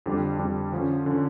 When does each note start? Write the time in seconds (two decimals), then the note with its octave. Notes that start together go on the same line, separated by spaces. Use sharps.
0.06 F2 D3 G3 D4
0.39 F2 D3 G3 D4
0.72 D3 F3 C#4
1.05 D3 F3 C#4